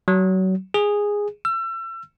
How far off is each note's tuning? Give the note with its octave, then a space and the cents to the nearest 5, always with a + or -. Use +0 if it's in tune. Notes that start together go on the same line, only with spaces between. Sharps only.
F#3 +25
G#4 -10
E6 +35